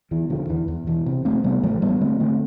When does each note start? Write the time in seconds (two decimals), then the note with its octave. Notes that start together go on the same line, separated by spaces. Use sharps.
0.11 E2 E3
0.30 E1 D3 F3
0.49 E2 E3
0.68 E2
0.87 E1 E3
1.06 C3
1.25 E1 A3 C4
1.44 C3 G3 B3
1.63 A1 F3 A3
1.82 A1 G3 B3
2.01 D3 A3 C4
2.20 D3 A3 C4